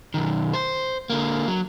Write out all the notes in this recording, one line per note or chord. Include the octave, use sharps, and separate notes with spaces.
B1 D#3
C5
D3 A#3
F#3